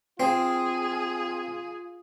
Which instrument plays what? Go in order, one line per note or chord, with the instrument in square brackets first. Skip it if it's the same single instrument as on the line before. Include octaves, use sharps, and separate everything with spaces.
[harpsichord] C4 [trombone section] F4 [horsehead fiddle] G#4